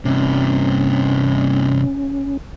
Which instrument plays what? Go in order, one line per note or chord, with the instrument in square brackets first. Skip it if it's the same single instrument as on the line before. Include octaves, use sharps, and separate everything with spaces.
[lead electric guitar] G2 C3 [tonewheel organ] C#4